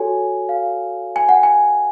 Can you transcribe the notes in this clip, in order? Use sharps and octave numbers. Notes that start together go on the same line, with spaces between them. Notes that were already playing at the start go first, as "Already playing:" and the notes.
Already playing: F#4 A4 C#5 G#5
F5
G#5
F#5
G#5